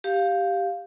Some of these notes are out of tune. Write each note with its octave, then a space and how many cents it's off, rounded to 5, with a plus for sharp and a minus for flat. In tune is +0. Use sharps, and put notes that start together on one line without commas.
G4 +0 F5 +0